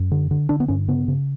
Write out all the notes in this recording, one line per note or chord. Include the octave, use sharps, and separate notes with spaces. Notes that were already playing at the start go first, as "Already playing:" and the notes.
Already playing: F#2
D3
D3
D3 D4
B3
G2 C#4
C#3 B3
C#3